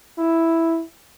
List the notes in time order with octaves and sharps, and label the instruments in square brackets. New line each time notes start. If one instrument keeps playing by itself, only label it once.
[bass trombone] E4